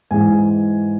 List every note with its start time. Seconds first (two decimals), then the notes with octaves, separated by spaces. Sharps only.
0.11 G#2 E3 G#3 G#5